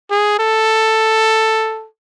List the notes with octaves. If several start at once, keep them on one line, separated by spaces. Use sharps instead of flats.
G#4
A4